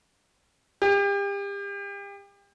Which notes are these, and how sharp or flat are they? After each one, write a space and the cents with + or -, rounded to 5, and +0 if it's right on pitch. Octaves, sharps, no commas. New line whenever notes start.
G4 +35